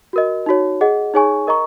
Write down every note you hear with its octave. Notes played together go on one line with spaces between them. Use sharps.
F#4 A#4 D#5
D#4 F#4 C#5
G#4 D#5 F#5
D#4 G#4 C#5 G#5 C#6
A#4 D#5 A#5 C#6